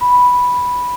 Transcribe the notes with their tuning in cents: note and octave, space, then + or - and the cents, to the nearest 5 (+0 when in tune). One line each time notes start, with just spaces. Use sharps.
B5 -5